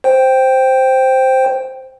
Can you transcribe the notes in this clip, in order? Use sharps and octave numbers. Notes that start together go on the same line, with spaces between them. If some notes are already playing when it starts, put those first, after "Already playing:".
C5 G5